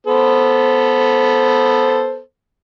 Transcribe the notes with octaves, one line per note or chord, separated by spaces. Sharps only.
B3 A4 C5